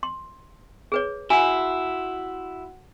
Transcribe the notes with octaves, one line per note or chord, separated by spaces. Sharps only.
C6
G#4 B4 C#5
E4 F#4 F#5 G#5